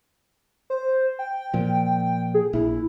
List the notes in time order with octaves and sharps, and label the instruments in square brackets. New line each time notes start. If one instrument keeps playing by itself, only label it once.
[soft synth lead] C5
G5
[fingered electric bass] A#2 F3
[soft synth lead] G#4
[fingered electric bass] A#1 [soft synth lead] E4